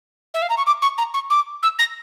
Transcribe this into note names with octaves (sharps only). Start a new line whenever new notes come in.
E5
F5
A#5
C#6
D6
C#6
A#5
C#6
D6
E6
A#6